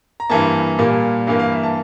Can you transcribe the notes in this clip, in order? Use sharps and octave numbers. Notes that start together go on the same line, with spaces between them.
A#5
G2 E3 A#3 A5
A#2 G3 A#3
G2 E3 A#3 F5
F5
E5
A5